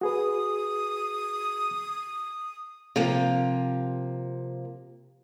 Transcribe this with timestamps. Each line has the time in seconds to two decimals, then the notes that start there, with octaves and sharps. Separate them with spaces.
0.01 F#4 G#4 B4 D#6
2.96 C3 F3 A#3